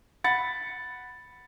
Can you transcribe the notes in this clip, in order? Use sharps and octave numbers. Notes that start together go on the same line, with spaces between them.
F#5 B5 A6 C#7